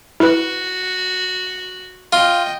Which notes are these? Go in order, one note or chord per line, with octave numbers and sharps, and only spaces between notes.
E4 F#4 B4
F4 D#5 G5